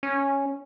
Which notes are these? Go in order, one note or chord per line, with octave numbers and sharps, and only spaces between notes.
C#4